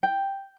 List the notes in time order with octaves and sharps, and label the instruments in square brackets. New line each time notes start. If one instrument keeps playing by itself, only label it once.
[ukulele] G5